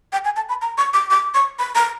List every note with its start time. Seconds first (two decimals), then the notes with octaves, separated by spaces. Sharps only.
0.13 G5
0.25 G#5
0.36 A5
0.49 B5
0.62 A#5
0.78 C#6
0.94 D6
1.11 D6
1.34 C#6
1.59 B5
1.75 A#5